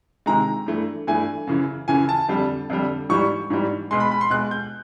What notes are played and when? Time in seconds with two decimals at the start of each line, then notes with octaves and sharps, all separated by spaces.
0.26 C3 D#3 G#3 A#5
0.66 G2 E3 A3
1.07 G2 E3 A3 G#5
1.47 F#2 C#3 E3
1.88 F#2 C#3 E3 G#5
2.09 A5
2.28 F2 D3 G3
2.70 F2 D3 G3
3.09 G#2 E3 G3 C#6
3.50 G#2 E3 G3
3.91 B2 G#3 C6
4.00 B5
4.11 B5
4.21 C6
4.30 B2 G#3 F#6
4.51 G6